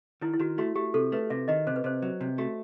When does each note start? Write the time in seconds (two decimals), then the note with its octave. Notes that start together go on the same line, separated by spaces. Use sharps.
0.21 D#3 E4
0.33 E4
0.40 D#3 F#4
0.58 A3 F#4
0.76 A3 G4
0.94 C3 A4
1.12 A3 B4
1.30 C3 E5
1.48 D#3 D#5
1.67 C3 C5
1.76 B4
1.84 C3 C5
2.02 F#3
2.21 C3
2.38 A3 F#4